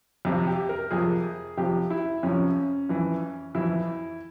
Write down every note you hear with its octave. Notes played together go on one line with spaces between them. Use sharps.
F2 C3 F3
G4
A#4
F2 C3 F3 G#4
F2 C3 F3 G4
E4
F2 C3 F3 C#4
F2 E3
F2 E3 E4